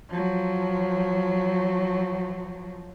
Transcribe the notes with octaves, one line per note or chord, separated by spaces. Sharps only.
F3 F#3